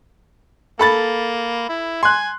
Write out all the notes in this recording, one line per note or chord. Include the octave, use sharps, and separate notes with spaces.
A#3 A4 B5 A6
E4
G#5 C6 F#6